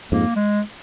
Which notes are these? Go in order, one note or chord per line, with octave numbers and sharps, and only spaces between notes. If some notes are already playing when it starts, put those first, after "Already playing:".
F2 G#2 A#3
G#3